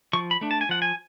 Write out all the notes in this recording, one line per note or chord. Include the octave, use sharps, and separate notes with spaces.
F3 C#6
B5
A3 D4
A5
G#5
F3 F#5
G#5